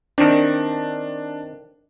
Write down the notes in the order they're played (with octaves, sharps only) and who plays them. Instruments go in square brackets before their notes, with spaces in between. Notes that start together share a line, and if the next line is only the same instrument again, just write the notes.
[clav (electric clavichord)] D#3 C4 [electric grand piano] D4